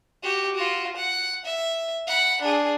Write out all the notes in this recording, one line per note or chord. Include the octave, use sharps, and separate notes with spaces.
F#4 G4
F4 F#4
F#5
E5
F#5 B5
D4 G#4